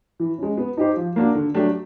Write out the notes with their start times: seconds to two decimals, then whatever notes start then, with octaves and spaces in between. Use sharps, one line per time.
0.20 E3
0.38 G#3 C#4
0.57 B3
0.77 D#4 G4 C5
0.96 F3
1.16 A#3 D4 F#4
1.35 D3
1.54 F#3 A3 D4 G4